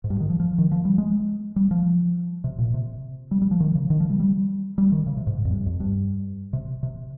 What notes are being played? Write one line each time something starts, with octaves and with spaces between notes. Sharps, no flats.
G#2
G2
D#3
F3
F3
D#3
F3
G3
G#3
G3
F3
C3
A#2
C3
G3
G3
F3
D#3
C#3
D#3
F3
G3
G3
G3
D#3
C#3
C3
G#2
F2
G2
F2
G2
C3
C3